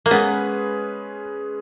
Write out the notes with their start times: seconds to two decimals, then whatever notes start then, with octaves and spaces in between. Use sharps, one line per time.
0.06 A#3
0.11 G#3 B3 C#4 G#4 B4